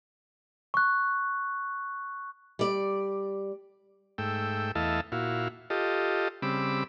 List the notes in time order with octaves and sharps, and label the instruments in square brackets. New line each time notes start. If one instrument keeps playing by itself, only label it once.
[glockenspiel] C#6 F#6
[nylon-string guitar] G3 D5
[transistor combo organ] G#2 A3 G5 E6
E2 A3 E4 D#5 F5 A5
A#2 E4 F#4 F5
F4 G4 A4 D#5
C#3 G3 C4 B5 D6 E6